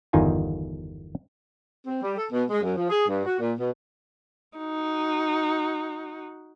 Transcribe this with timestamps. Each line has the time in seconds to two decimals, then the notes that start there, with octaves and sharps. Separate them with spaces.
0.13 G1 E2 D#3 D#4 F4 G#5
1.86 C4
2.02 G3
2.17 A4
2.31 B2
2.50 G#3
2.62 F#2
2.76 F3
2.90 G#4
3.07 G2
3.26 F#4
3.39 A#2
3.59 B2
4.58 D#4 F#4